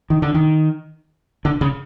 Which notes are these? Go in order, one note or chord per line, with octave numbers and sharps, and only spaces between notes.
D#3
D3
D#3
D3
C#3